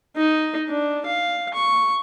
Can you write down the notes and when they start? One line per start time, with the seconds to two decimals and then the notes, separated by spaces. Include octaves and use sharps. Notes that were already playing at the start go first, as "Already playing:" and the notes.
0.17 D#4
0.68 D4
1.06 F5
1.53 C#6